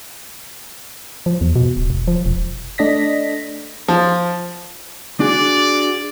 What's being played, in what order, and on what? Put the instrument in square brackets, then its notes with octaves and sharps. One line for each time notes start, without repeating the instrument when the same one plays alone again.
[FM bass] F3
E2
B2
D1
E1
F3
E1
[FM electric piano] A3 D4 D#5 A#6 B6
[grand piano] F3
[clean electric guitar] D4 F#4 G#4 [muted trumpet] D5